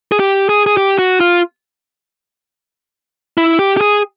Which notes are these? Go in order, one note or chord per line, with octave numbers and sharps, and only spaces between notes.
G#4
G4
G#4
G#4
G4
F#4
F4
E4
G4
G4
G#4